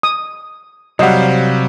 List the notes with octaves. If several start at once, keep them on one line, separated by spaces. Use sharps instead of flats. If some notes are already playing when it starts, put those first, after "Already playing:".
D#6
C3 F#3 G3 C5 D#5 F5 F#5